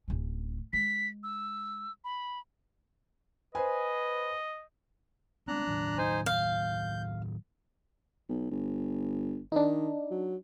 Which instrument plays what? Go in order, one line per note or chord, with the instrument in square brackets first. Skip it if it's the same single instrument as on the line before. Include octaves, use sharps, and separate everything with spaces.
[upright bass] D1 C#4
[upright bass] G#3 [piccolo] B6
[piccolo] E6
B5
[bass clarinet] B4 [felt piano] C5 G#5 [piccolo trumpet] D#5
[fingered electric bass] G#3 B3 C4 [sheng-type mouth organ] D4 A#5 F#6
[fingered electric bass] A2 D#3 F#3
[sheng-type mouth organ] D#4 C5 G#5
[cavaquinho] F5 [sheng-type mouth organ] G6
[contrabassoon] B1
G1
[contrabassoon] D#3 [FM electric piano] D4 D#4
[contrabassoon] F#3